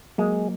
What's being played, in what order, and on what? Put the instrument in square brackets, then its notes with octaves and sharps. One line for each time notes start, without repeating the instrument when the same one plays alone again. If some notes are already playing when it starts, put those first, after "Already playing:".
[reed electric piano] F#3 A#3 [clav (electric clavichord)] G#3